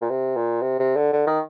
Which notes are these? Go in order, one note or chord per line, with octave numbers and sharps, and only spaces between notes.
A#2
C3
A#2
C3
C3
D3
D3
D#3